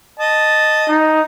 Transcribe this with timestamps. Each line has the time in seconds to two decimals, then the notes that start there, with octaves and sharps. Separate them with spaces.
0.19 D#5 A5
0.88 D#4